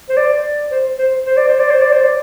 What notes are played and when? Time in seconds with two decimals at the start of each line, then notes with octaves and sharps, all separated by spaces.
0.09 C5
0.17 D5
0.71 C5
0.99 C5
1.26 C5
1.37 D5
1.48 C5
1.60 D5
1.71 C5
1.81 D5
1.92 C5
2.04 D5